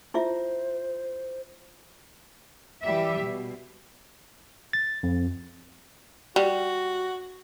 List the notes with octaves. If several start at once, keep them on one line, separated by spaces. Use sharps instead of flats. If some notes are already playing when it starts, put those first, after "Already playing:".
E4 F4 C5 E5
E3 G3 G4 E5
B2
A6
F2
G3 F#4